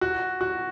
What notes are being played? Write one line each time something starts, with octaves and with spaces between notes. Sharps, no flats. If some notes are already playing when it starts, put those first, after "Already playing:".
F#4
F#4